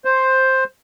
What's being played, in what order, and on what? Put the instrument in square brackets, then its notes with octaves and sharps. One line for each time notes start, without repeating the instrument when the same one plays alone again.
[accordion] C5